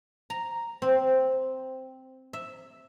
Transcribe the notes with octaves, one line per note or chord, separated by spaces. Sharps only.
A#5
C4
E5